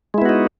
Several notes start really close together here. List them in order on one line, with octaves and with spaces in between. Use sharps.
G#3 E4 B3 F#4 D#4